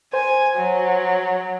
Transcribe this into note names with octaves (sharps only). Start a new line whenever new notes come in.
C5 G#5
F#3